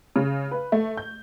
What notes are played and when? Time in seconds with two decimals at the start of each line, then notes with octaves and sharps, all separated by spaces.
0.16 C#3
0.51 B4
0.72 A3
0.97 G6